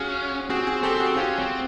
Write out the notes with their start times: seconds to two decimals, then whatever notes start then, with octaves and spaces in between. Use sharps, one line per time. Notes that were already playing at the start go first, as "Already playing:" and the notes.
Already playing: C#4 F4 F#4 G#4
0.50 C4 F#4 G#4
0.67 F#4 G#4
0.83 C4 G4 A4
0.95 G4
1.00 F#4 G#4
1.16 C#4 F4 G4
1.39 C4